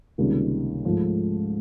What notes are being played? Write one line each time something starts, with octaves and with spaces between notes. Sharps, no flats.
C#2 C3 D#3 G3 A#3
G#2 F3 A3